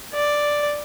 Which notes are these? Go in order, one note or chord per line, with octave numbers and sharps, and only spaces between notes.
D5